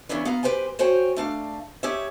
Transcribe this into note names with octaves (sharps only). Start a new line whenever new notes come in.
C#3 E3 B3 C#4 D4
B3 F5 A#5
G4 B4 C5 G5 G#5
F#4 C5 C#5 G5 G#5
A3 D4 F5
G4 G#4 C#5 E5